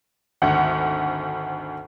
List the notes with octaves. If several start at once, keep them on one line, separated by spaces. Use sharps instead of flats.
G#1 D2 E5 F#5